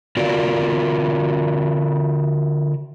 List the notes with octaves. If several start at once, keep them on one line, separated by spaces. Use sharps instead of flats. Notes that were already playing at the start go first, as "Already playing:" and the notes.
D3 F4 F#4 A#4 D5